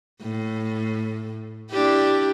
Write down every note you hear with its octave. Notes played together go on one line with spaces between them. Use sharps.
A2
D4 E4 G4